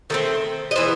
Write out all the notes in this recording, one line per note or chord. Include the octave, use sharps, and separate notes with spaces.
D#3 A3 C4 A4
D#5
E3 B3 C5